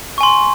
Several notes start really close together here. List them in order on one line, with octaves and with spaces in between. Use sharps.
C#6 G#5 C6